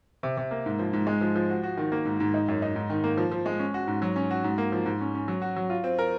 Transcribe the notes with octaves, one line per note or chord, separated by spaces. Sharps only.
C3
C3
A#3
G#2
F3
G#2
G#3
F3
F3
F#4
F#4
D#3
A#3
G#2
G#2
D#4
F#2
D#4
G#2
D#3
A#3
F3
F3
G#3
C#4
F#4
G#2
F#3
C#4
F#4
G#2
A#3
F3
G#2
C#4
C#4
F#3
F#4
F#3
F4
C4
A#4